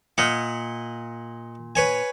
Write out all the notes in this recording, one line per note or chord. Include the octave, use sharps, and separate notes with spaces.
A#2 D#5 F#5
B4 C#5 G#5